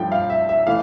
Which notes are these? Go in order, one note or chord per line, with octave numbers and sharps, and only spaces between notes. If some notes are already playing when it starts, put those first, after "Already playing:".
Already playing: G2 F3 A3 G5
F5
E5
E5
E3 A3 F5